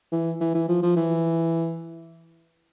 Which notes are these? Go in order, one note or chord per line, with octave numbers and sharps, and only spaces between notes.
E3
E3
E3
F3
F3
E3